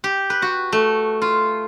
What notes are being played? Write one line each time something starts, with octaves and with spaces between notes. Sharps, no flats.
G4
B4
F#4
A3
F4